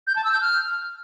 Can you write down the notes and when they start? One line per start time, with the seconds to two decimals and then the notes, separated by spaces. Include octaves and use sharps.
0.07 G6
0.16 A5
0.24 E6
0.33 G6
0.41 F6